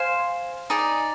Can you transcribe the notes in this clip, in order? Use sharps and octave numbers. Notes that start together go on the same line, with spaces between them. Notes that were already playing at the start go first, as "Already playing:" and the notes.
Already playing: C5 F5 G#5 C6
D#4 G#4 D5